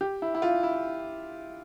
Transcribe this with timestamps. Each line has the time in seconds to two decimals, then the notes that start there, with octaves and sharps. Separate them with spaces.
0.01 G4
0.22 E4
0.35 E4
0.42 F4
0.63 E4